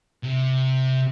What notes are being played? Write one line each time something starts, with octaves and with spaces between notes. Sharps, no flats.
C3